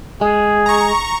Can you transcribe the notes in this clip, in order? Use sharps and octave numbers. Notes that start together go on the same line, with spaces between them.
G#3 G#4
A#5 C#6